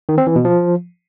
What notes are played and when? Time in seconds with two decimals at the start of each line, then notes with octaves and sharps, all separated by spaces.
0.09 D#3
0.18 C4
0.27 E3
0.36 B2
0.45 F3